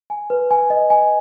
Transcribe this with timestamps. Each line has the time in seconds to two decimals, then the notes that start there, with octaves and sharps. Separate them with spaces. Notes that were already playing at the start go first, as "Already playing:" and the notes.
0.10 G#5
0.30 B4
0.51 G#5
0.70 D#5
0.90 G#5